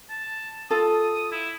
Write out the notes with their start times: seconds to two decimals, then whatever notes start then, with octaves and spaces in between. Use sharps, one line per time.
0.10 A5
0.70 F4 A4 D#6
1.32 E4